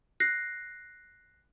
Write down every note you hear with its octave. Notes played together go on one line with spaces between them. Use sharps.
F#6 A#6 C7